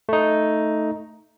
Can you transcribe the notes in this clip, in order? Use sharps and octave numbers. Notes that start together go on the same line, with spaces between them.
A3 D#4